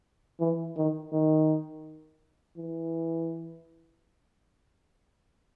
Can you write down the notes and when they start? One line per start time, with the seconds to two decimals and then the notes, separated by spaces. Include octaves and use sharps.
0.40 E3
0.77 D#3
1.12 D#3
2.57 E3